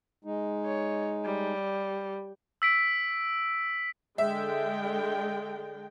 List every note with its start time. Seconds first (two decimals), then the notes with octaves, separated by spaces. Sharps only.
0.24 G#3 D#4
0.66 C#5
1.25 G3
2.62 E6 B6 D7
4.18 D3 G#3 E5 G5